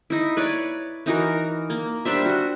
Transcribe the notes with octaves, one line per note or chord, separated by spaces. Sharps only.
D#4 E4
B4 C#5 D5
E3 D#4 F#4 A#4
A#3
G3 D4 C5 E5
F#4